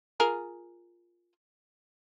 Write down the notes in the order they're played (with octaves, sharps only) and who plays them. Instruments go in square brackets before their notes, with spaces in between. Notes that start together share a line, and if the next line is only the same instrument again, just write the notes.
[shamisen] F4 G#4 A#4